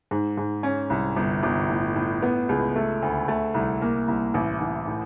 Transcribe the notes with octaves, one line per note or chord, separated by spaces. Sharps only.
G#2
G#2
C#4
C2
G1
G1
A2
A2
B3
C#2
A3
D2
A3
C2
A#3
C2
A1
A1
A2